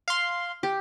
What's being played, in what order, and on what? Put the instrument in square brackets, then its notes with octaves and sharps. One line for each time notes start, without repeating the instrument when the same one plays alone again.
[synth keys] F5 C6
[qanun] G4